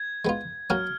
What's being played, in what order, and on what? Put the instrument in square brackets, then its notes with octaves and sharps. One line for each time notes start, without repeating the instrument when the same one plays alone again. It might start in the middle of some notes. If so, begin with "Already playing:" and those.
Already playing: [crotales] G#6
[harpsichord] G#3 B3 F4
[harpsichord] F#3 A#3 C#4 F#4 [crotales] F6